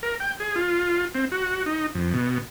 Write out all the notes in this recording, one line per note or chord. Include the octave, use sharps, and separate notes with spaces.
A#4
G5
G#4
F4
C4
F#4
D#4
F2
B2